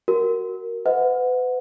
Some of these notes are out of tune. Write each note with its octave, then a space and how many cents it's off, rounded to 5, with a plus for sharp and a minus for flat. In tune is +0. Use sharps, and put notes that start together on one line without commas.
F#4 +10 A#4 -5
B4 +35 D#5 +40 F#5 -20